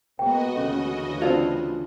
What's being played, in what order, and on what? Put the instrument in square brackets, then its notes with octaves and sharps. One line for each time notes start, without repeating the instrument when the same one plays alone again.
[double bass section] C#2 A#3 B3 [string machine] F#4 D#5 [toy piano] G#4 G5
[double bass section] D2 C#3 E3 [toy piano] C#4 G4 A4
[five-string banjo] C4 D4 F4 [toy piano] D5 A5